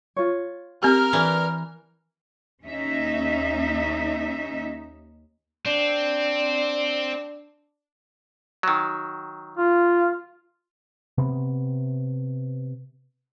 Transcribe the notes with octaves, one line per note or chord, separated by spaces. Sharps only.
F4 C#5
C4 G4 A#4 F6
E3 B4 D5
D#2 C#4 D#4 E5
C4 D4
D#3 F#3
F4
C3 B3